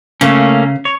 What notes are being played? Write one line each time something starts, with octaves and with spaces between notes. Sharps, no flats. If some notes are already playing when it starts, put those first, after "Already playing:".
C#3 A3 A#3 C#4
C#5